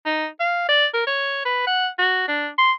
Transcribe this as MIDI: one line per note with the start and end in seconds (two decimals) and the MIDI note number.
0.05 0.26 63
0.39 0.65 77
0.69 0.86 74
0.94 1.03 70
1.07 1.41 73
1.45 1.66 71
1.67 1.87 78
1.98 2.25 66
2.28 2.48 62
2.58 2.72 84